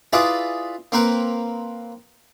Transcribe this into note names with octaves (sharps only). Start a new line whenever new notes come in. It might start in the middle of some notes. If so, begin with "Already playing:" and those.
E4 F4 G#4 B4 D5 E5
A#3 C4 A#4 B4